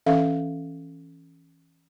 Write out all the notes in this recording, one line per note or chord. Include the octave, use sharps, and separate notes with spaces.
E3 C#4 A4 E5 F5